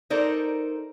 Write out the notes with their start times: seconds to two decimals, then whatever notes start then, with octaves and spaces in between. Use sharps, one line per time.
0.10 D#4 A4 A#4 C5 D5